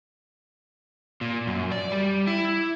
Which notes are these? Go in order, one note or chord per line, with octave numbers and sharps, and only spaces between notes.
A#2
F#2
D5
G3
E4